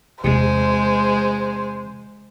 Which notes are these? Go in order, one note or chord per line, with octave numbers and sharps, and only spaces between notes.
E2 C3 G#3 C5